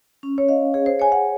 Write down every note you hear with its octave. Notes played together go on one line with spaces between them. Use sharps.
C#4
C#5
D#5 F5
G#4 C#5
C5
C#5 G#5
F#5